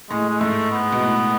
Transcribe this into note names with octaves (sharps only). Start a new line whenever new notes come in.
A2 G#3
G#3
G#2 A3
B3
B2
A2